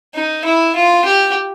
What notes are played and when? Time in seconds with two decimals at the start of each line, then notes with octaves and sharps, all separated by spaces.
0.15 D#4
0.44 E4
0.75 F4
1.05 G4